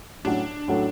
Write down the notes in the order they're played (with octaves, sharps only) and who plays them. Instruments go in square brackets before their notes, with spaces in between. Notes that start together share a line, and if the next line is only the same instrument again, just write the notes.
[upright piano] A2 F#3 C#4 F#4 [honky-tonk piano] D4
[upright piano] A2 F#3 C#4 F#4 A4